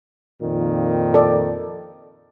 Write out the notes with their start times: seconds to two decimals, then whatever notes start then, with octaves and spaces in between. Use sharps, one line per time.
0.41 F2 A#2 D#3
1.14 A4 D5